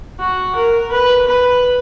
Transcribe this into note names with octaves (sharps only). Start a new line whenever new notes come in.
F#4
A#4
B4
B4